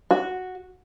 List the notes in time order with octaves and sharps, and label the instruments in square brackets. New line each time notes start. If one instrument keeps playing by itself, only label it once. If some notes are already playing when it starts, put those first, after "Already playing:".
[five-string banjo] F#4